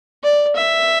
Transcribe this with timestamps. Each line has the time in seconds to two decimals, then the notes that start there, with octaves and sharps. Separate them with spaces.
0.23 D5
0.56 E5